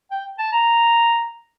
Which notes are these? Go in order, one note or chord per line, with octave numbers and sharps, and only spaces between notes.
G5
A5
A#5